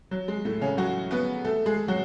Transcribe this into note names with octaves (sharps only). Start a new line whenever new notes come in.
F#3
G#3
A2 A3
C#3 C#4
F#3 F#4
B3 B4
A3 A4
G#3 G#4
F#3 F#4